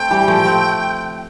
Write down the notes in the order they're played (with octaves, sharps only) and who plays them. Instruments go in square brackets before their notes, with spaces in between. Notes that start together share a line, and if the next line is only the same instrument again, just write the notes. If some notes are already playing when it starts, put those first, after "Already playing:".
Already playing: [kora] A3 C4 [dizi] G5
[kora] E3 G3
F3 A3
A3 C4